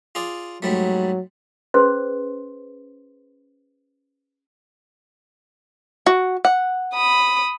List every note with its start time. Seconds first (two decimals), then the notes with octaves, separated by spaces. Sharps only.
0.15 F4 G#4 D5
0.62 G#2 F#3 G3 A3
1.74 C#4 G#4 B4 C5 C6
6.06 F#4
6.45 F#5
6.94 B5 D#6